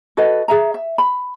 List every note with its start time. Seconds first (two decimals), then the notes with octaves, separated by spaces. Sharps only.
0.17 F#4 A4 B4 D#5
0.48 G#4 E5 A#5
0.74 E5
0.98 B5